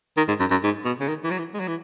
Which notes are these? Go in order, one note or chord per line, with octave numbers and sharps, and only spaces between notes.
D#3
G#2
F#2
F#2
G#2
B2
C#3
D#3
E3
F#3
E3
G#3
F#3
E3